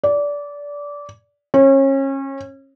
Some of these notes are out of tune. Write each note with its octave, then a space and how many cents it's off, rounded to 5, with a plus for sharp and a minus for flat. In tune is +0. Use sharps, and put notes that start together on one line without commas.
D5 -20
C#4 -30